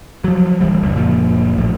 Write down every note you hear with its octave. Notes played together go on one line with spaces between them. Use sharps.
F3 F#3
D1 C2 E3 G3
E1 C#2
F#1 A#2 F3
A#1 A2 F3